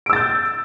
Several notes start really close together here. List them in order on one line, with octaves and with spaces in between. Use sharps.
D7 E6 A6 G6